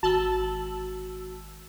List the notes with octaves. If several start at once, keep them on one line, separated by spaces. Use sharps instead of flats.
G#1 F#4 A5 E6 F#7 G7